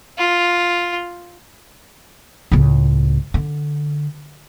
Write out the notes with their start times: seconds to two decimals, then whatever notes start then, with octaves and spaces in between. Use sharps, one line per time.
0.17 F4
2.52 C#2 A2
3.34 D3